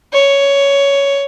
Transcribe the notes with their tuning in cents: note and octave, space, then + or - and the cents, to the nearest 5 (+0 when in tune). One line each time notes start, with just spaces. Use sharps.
C#5 +10